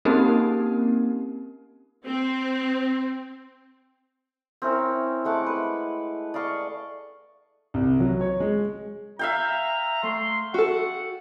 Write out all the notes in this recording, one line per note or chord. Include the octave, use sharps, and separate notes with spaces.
A#3 C4 C#4 D#4 G4 A#4
C4
C4 C#4 E4 A#4
G#3 A3 F#5 D6
B4
D5 D#5 F5 C#6
C2
F#3
C#5
G#3
E5 F5 G5 A#5
A3 C6
F#4 A4 F#5